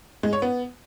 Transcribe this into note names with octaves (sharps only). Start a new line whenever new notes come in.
G#3
C#5
B3